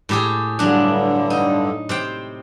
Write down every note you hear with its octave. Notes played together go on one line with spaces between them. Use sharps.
A2 G4 G#4
G2 D3 F#3 D4
D#4
C3 C5 G5